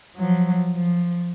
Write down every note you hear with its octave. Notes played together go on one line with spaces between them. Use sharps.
F3 F#3
F3